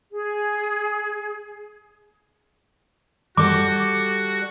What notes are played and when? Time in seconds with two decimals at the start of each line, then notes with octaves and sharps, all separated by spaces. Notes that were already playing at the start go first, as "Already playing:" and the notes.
0.12 G#4
3.37 G3 F#4 A4 F#5 D6